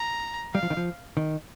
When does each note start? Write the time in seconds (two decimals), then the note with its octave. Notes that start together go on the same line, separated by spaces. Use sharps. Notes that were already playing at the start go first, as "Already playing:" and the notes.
Already playing: A#5
0.54 G3 F5
0.63 F3
0.70 D#3
0.77 F3
1.17 D#3